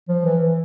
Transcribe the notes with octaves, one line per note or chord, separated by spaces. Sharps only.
F3
E3
E3